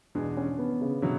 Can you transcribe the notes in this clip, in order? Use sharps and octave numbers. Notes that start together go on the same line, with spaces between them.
E2 B2 G#3 D4
C#4
B3
C#3
B2 D3 F#3 C#4 E4